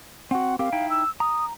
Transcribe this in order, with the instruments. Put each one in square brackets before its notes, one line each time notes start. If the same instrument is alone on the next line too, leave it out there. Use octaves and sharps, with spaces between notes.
[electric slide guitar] C4 F#4 [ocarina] F#5
[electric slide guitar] C4 G4 A#4 [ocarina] F5
[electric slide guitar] D#4 E4 G5
[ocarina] E6
[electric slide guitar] A#5 [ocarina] D#6